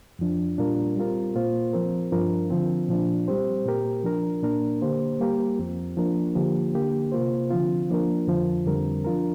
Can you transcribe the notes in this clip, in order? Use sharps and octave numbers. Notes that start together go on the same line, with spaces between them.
F2 F3 D4
A#2 G3 D4 F4 A#4
G3 C4 F4 A#4
A#2 A#3 F4 C5
F3 C4 A#4
G2 F3 D4 F4 A#4
D3 F3 C4
A#2 F3 D4
G3 C4 G4 C5
A#2 A#3 G4 A#4
F3 D4 A#4
A#2 A#3 D4 A#4
D3 A#3 G4 C5
G3 A#3 G4 A#4
F2 F3 C4
F3 A#3 D4 A#4
D3 F3 A#3 G4
D3 A#3 G4
C3 A#3 F4 C5
D3 F3 C4 F4
F3 A#3 D4 A#4
F2 D3 F3
F2 D3 G3 C4 A#4
F3 D4 F4 A#4